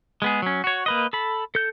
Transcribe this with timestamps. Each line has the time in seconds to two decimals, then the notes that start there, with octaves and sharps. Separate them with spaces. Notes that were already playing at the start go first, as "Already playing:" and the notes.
0.22 G#3 B3 G#4
0.42 F#3 C#4
0.64 F#4 C#5
0.86 A#3 B4 D#5
1.13 A4 B5
1.55 A4 G6